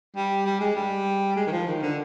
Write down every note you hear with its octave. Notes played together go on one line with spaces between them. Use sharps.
G3
G3
G#3
G3
G#3
D#3
F3
D#3
D3